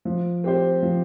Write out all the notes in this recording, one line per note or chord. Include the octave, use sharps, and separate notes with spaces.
F3
C4 G4 C5
F3